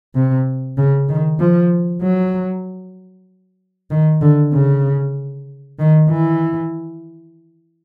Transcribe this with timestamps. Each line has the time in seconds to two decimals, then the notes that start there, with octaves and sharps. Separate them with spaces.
0.15 C3
0.78 C#3
1.09 D#3
1.40 F3
2.02 F#3
3.91 D#3
4.22 D3
4.53 C#3
5.79 D#3
6.10 E3